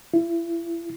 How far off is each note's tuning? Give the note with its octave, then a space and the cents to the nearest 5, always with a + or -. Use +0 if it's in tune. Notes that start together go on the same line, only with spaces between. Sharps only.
E4 +35